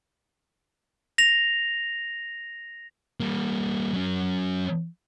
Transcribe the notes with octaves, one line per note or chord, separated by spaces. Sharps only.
A#6 F7
G3 A#3
F#3 C#4